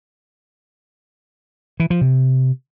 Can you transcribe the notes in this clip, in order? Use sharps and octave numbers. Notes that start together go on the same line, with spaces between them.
E3
F3
C3